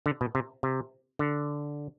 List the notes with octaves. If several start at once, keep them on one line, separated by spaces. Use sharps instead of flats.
D3
B2
C3
C3
D3